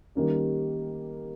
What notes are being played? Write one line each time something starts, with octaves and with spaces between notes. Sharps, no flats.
D#3 G3 A#3 C#4